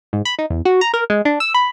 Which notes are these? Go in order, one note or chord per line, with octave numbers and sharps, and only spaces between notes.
G#2
B5
D#4
E2
F#4
A#5
A#4
G#3
D4
E6
B5